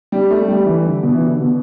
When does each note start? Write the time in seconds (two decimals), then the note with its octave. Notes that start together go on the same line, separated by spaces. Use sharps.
0.12 G3
0.31 A3
0.48 G3
0.66 E3
0.85 D3
1.03 B2
1.14 E3
1.21 D3
1.39 B2